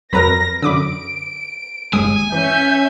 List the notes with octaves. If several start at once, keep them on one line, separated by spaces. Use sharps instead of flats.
F2 F#3 A#4 B4 A#5 B5 A#6
F#2 D3 B5 D6 D#6 D7
G1 D#2 G#3 G#5 D#6
E3 C#4 E5 G6